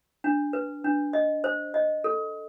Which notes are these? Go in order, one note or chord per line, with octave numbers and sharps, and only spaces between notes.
D4
B4
D4
D#5
C5
D#5
A4